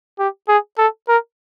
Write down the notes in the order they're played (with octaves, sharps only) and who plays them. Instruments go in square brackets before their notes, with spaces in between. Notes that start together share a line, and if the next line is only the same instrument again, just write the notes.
[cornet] G4
G#4
A4
A#4